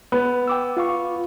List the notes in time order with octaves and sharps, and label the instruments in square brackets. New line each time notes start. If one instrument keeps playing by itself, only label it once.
[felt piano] B3
[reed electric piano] G5 D6 E6
F4 F5 C#6